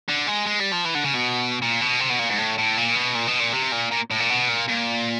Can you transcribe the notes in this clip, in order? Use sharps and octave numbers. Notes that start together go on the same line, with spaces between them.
D3
G#3
G#3
G3
F3
E3
D3
C#3
B2
A#2
B2
C3
B2
A#2
G#2
A2
A2
A#2
B2
A#2
B2
A#2
C3
A#2
A#2
A2
A#2
B2
A#2
A#2